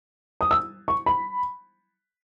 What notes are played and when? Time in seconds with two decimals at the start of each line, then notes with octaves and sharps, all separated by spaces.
0.41 D#6
0.51 E6
0.88 C#6
1.06 B5